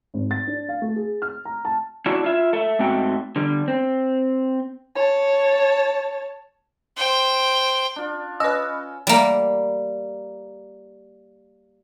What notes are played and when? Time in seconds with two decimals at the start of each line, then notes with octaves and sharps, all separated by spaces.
0.14 G#1
0.31 A6
0.47 D4
0.69 F5
0.82 A3
0.96 G#4
1.22 F6
1.45 A#5
1.65 A5
2.06 D4 E4 F#4
2.24 F4 E5
2.53 A4 E5
2.79 G#2 A3 C4 F#4 G5
3.36 D3 G3
3.68 C4
4.96 C#5 A5
6.97 C5 G5
7.96 D4 F4
8.40 C#4 B4 D#5 E6
9.07 G3 A#3